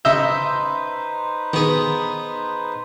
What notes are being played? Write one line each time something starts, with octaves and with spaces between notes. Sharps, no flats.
C#3 D#4 B4 C5 D#5 E5 G6
D#3 B3 G#4